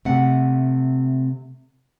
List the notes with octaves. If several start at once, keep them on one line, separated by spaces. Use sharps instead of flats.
C3 A3 F#5